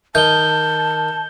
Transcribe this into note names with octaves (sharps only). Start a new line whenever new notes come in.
D#3 A5 G6 G7